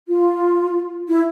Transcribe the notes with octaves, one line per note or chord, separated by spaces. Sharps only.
F4
E4